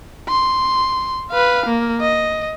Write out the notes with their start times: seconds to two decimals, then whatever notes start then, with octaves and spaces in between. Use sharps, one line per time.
0.29 C6
1.31 B4 F5
1.66 A#3
2.01 D#5